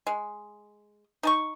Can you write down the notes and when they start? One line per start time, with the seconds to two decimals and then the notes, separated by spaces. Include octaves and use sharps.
0.07 G#3
1.23 D#4 A5 C#6